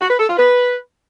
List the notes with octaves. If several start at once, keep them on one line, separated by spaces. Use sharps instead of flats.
F#4
B4
A4
F4
B4